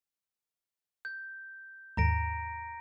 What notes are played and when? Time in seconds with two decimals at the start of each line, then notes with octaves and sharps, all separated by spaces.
1.05 G6
1.97 D#2 G#2 A#5 A#6 D7